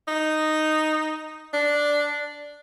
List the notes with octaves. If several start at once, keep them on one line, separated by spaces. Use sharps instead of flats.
D#4
D4